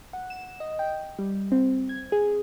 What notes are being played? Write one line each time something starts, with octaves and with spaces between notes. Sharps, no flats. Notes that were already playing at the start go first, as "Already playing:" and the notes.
F#5
E7
D#5
G5
G3
C4
G#6
G#4